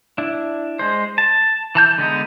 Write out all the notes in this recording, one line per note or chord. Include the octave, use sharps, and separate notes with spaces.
D4 E4
G#3 C5
A5
E3 A5 G6
D3 G#3 B3 D#4